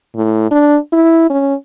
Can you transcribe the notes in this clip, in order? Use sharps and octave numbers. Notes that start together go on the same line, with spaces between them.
A2
D4
E4
C#4